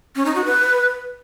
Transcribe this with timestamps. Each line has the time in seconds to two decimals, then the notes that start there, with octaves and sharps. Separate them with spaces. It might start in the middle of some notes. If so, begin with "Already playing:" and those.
0.16 C#4
0.26 D#4
0.35 F#4
0.45 B4